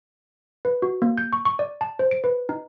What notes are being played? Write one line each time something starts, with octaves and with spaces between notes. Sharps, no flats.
B4
F#4
A#3
G6
C#6
C#6
D5
A5
C5
D7
B4
D#4